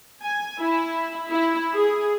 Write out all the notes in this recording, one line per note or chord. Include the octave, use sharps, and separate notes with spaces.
G#5
E4
E4
G#4